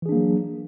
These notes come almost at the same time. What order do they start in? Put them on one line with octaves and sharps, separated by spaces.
E3 G#4 D4 A#3 F#3